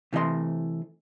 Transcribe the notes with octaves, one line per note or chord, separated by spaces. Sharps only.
C3 E3 A3 D#5 C6